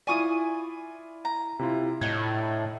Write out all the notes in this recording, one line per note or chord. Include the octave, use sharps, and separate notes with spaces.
E4 F4 D5 G#5 C#6 D#6
A#5
C3 E4 F4
A2 D4 D#4 G#6